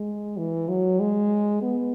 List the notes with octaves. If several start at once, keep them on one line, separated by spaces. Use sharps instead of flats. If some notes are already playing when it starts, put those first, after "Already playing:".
Already playing: G#3
E3
F#3
G#3
B3